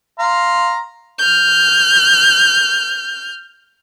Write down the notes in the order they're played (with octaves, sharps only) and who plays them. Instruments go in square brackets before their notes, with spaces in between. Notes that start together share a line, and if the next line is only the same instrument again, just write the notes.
[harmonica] F5 A#5 C6
[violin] F6 G6